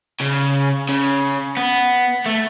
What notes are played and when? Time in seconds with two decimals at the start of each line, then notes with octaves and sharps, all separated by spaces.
0.21 C#3
0.89 C#3
1.57 B3
2.26 A3